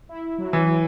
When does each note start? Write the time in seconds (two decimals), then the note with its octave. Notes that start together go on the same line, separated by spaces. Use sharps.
0.09 E4
0.38 F#3
0.53 E3
0.69 E4